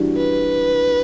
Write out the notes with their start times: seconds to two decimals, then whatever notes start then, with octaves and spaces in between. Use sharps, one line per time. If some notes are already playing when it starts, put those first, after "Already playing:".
Already playing: E3 G3 D4 F#4
0.17 B4